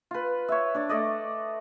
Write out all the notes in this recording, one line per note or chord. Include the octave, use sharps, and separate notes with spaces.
F4 B4
C#5 E5
D4 D5
A3 D5 D#5